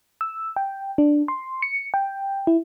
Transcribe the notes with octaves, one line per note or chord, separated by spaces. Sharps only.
E6
G5
D4
C6
C#7
G5
E4